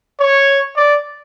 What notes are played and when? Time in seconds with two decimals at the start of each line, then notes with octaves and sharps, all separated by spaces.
0.20 C#5
0.76 D5